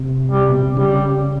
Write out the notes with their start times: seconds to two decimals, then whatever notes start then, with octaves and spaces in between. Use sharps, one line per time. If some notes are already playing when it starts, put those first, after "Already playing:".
Already playing: C3
0.31 G3
0.49 B2
0.63 C3
0.77 C#3 G3